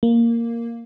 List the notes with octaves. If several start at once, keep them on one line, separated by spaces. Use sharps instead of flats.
A#3